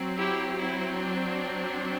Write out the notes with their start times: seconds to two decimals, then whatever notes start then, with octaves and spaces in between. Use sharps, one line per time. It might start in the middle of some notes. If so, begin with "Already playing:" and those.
Already playing: F#3 C4
0.17 E4 G4
0.57 E4
0.99 D4